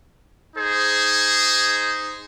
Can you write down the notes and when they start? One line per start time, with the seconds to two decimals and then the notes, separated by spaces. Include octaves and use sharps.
0.56 D#4 G#4 C5